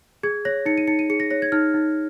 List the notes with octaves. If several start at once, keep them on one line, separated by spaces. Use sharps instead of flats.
G#4 G#6
C#5 A#6
D#4 C#7
D#7
D#4 C#7
D#7
G#4 C#7
A#6
C#5 A#6
G#6
D#4 F6
D#4